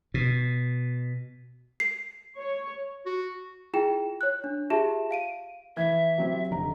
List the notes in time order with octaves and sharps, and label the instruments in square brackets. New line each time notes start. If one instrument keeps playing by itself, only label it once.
[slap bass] B2
[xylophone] C7
[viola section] C#5
[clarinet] F#4
[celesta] E4 F4 G#4 G5 E7
C#5 F#6
D4
F4 G4 G#4 E5 A5 E7
F5 D7 D#7
[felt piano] E3 G#6 [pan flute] E5
[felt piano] F#3 C4 G4
F1 D3 A#5